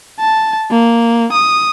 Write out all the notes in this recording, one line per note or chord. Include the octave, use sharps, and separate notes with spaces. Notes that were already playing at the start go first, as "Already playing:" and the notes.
A5
A#3
D#6